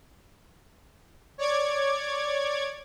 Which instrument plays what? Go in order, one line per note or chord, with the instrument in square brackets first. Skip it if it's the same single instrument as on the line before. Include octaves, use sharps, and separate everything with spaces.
[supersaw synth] C#5 D5 D6 G#6